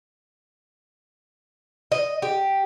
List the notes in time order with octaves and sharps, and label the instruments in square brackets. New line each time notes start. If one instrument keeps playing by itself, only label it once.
[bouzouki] D#5
G4